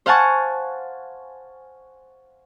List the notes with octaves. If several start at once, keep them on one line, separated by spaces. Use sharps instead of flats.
C5 F5 F#5 G#5 A5 C#6